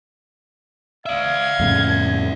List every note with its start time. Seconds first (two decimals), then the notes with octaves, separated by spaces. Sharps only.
1.06 D5 E5 F5 G#6
1.60 F2 A2 C#3